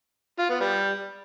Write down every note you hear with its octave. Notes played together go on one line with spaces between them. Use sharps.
F4
B3
G3